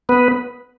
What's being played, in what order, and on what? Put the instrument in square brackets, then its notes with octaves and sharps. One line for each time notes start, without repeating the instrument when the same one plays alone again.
[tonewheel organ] B3 B4